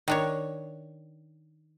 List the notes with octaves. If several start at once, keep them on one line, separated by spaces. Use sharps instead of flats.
D#3 D4 C#5